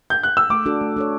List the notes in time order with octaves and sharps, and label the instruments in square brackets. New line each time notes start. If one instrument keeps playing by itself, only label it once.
[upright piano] G6
F#6
E6
[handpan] A3 [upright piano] D6
[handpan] D4 F#4 A4
A3
D4 A4 C#5